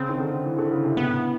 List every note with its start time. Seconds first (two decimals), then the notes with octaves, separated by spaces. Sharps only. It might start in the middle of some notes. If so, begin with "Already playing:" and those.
Already playing: C#3 C4
0.09 D#3
0.20 D3
0.46 E3
0.58 D3
0.71 C#3
0.84 C3
0.96 A2 B3